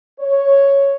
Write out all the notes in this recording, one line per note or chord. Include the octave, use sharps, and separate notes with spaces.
C#5